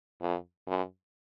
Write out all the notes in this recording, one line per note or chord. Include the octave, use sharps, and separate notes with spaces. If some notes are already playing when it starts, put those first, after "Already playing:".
F2
F#2